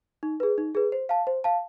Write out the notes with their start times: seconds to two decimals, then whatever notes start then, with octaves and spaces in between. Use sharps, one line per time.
0.23 D#4
0.40 G#4 B4
0.58 D#4
0.75 G#4 B4
0.92 C5
1.09 F5 A5
1.27 C5
1.44 F5 A5